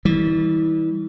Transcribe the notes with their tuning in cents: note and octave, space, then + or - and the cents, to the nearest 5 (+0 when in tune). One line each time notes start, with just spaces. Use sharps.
E3 -30 G3 +0